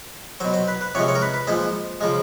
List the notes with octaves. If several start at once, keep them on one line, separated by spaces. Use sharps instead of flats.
B2 F#3 C5
C5
B4
B4
C3 F3 G#3 C#5
C#5
A#4
B4
B4
A#2 F3 G#3 C5
C#3 F3 G#3